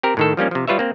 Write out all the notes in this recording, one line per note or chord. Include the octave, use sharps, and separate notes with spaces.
C4 G4 A#4
A2 D#3 A4
F3 G3 A#3 C#4
C3 F3
G3 F4 B4 C#5 E5
A#3 C4